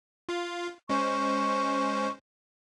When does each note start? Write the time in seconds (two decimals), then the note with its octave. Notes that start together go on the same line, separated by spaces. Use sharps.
0.29 F4 F5
0.89 G#3 C#4 C5 C#6